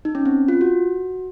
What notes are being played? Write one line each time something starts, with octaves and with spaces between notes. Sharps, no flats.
D#4
C#4
C4
F4
F#4